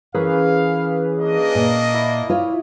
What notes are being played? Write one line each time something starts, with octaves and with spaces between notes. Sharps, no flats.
E3 C#4 G#4 A#4 B4 F5
A#3 D4 D#5
A#2
E4
F4 C#5 D5